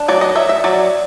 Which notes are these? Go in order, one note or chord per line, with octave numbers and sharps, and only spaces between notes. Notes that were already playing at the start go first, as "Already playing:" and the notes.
Already playing: D4
F#3 D5
D#5
F#3 E5
E5
F#3 D5